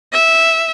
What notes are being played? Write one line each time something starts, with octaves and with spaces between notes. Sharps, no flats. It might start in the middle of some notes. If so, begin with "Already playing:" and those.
E5